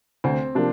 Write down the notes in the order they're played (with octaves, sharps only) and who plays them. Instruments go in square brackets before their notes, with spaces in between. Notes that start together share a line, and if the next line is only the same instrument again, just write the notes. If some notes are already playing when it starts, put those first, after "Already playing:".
[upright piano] D2 [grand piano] C4
[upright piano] C3 F3 A#3 [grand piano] D4